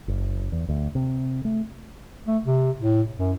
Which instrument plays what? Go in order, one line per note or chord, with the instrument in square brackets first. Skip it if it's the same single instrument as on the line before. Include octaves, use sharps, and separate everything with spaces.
[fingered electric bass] F#1
E2
D2
C3
A3
[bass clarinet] A3
C3
A2
F#2